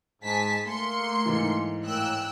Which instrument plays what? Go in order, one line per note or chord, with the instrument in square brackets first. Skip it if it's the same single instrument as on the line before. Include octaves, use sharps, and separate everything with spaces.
[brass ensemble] G#2 [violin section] G#5 A5 B6
[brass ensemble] A3 A#3 [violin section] C6 C#7
[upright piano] G#2 E3
[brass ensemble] A2 A#3 [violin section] G5 E6 F#6